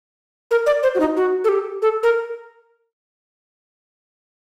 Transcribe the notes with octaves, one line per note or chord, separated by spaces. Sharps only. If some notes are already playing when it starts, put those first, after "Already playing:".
A#4
D5
C5
F#4
D#4
F#4
A4
G4
A4
A#4